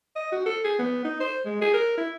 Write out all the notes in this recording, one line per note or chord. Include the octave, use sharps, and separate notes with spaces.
D#5
F#4
A4
G#4
B3
D#4
C5
G#3
G#4
A#4
E4